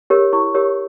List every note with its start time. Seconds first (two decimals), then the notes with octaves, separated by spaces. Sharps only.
0.10 G4 A#4 C#5
0.33 E4 C#6
0.54 G4 A#4 C#5